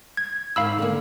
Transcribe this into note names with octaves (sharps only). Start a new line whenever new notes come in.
G#6
G#2 D#3 F5 B5 E6
D3 A#3